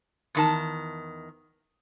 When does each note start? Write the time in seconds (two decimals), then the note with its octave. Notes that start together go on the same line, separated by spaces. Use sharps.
0.35 E2 D#3 A5